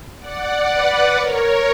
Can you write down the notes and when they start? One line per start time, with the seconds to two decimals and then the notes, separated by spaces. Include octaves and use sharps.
0.19 D5 F#5
0.68 B4 D5
1.16 A#4 C#5